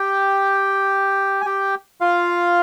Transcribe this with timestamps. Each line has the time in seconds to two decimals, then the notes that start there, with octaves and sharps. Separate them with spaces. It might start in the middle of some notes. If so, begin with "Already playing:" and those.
Already playing: G4 G5
1.41 G#5
1.45 G4 G5
2.01 F4 F5